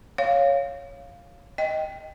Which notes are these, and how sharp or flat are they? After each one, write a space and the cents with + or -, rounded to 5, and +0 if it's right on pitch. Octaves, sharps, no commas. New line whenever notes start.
C#5 +0 F5 +0
D#5 +0 G5 +0